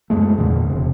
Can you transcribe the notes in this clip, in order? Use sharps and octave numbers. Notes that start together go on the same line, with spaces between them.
F#2 G#3 A3
E2 A#2 D3
E1 C3